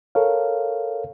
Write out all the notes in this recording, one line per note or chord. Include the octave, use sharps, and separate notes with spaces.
A4 A#4 C#5 F5